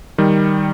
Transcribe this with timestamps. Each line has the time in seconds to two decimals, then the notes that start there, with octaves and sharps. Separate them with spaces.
0.18 D#3 G3